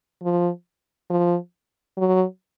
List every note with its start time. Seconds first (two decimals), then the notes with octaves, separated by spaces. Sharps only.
0.23 F3
1.10 F3
1.97 F#3